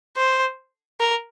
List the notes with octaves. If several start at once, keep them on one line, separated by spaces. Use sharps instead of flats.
C5
A#4